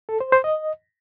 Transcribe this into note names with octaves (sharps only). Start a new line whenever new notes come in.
A4
C5
C5
D#5